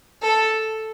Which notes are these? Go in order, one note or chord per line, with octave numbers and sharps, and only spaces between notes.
A4